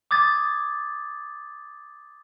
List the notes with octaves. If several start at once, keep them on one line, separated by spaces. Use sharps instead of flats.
D6 D#6 G#6 A6